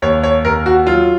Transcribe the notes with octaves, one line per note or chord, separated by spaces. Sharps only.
D#2 C#5
C#5
D#2 A#4
F#4
F#3 F4